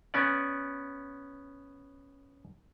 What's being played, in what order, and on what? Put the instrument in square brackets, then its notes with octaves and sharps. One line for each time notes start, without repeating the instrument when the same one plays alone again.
[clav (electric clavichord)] B3 C#4 D5